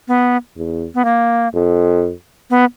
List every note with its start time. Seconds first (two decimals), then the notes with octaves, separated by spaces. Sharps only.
0.08 B3
0.57 E2
0.95 B3
1.05 A#3
1.54 F2
2.50 B3